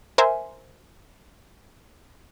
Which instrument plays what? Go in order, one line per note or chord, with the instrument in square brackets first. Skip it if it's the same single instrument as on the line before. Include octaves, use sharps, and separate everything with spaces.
[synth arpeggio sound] A#4 C5 E5 G#5